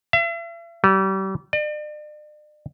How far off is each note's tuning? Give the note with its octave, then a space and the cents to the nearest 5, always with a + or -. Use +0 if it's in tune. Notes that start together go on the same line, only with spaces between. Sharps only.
E5 +45
G3 -35
D5 +40